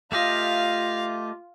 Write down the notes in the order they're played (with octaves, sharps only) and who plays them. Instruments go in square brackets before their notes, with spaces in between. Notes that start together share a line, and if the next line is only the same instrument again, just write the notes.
[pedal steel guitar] A3 G4 D#5 [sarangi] F4 [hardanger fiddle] F5